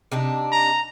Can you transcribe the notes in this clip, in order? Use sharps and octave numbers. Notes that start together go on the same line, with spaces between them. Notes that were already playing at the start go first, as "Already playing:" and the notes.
C3 D4 D#4
A#5